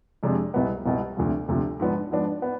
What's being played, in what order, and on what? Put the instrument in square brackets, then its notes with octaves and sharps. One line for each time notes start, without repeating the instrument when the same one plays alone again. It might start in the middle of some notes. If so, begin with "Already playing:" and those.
[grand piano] F2 C3 G#3 D4 G#4
C2 B2 B3
C2 B2 B3
D2 C3 F3
D2 C3 F3
G#2 F3 B3 D4
G#2 F3 B3 D4
B3